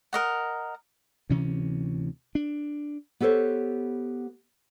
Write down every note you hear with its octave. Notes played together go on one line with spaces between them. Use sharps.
A#4 D#5 F#5
D2 C3 E3 C#4
D4
B3 G4 A4 C5 C#5